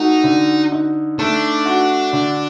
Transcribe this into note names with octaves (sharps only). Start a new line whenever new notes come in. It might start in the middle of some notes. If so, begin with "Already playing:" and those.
Already playing: A3 D#4 F#4
D3
D#4
A3 D4
F#4
D3